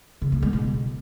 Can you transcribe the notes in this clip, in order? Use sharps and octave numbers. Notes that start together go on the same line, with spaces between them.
C#3
A#3
G#3
B2